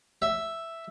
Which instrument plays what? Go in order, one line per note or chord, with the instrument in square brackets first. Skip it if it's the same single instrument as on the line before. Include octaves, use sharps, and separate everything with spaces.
[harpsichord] E5